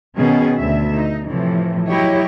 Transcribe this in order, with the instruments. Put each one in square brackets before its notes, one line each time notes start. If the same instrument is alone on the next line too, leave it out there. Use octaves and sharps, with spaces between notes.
[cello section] B2 D#3 C#4 G#4
D2 E5
D#4
A2 C3 E3 F3
F#3 E4 G4 C#5 D#5